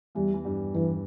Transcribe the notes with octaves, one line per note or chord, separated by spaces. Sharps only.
E2 E3 G3
E3
G2 G3
G2 E3 G3